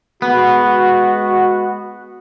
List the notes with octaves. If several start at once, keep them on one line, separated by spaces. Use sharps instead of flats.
G#3 B3 F#4